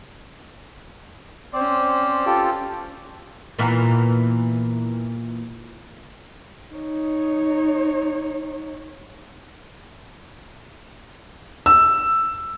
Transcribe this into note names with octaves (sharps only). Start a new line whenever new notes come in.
C4 C#4 C5 D5
F4 G4 A4
A#2 E3 B3
D#4 C#5
E6